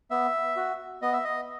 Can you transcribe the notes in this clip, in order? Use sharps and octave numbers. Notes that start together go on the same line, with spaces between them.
B3 E5
F#4
B3 D#5
E5
D#5